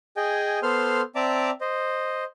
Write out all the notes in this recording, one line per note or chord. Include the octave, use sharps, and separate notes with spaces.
G#4 D#5 G5 G#5
B3 A4 C5 C6 F6
C4 D5 E5 A5 A#5 D6
C5 D#5